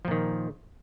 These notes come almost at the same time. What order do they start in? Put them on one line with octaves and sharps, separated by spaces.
F3 A#2 D#3